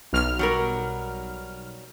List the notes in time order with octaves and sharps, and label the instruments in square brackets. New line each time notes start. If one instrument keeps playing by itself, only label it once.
[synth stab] B1 F6
[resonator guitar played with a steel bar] F#3 G3 A#4